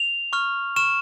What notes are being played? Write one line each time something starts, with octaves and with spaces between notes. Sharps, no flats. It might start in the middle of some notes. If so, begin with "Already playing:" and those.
Already playing: F7
C#6 F6
C#6 F6 E7